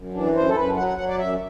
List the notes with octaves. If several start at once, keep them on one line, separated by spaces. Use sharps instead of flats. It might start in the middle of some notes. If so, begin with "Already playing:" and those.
Already playing: F#2
E3 D4
F#2 C5
A4
F#2 B4
F#3 F#5
F#5
F#3 F#5
D5
F#2 E5